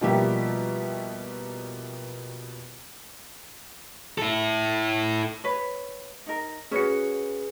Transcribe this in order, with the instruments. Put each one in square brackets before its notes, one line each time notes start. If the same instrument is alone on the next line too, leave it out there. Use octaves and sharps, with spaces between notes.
[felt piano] B2 F3 G3 A#3 G4 E5
[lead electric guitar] E4 A4
[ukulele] B4 C#5
D#4 A#4
[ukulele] C#4 F#4 [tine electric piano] G#4 B4 C#7